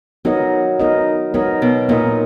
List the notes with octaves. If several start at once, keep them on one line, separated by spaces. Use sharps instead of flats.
F#3 B3 D#4 A#4 D#5
B3 D#4 A#4 D#5
F#3 B3 D#4 A#4 D#5
B2
A#2 B3 D#4 A#4 D#5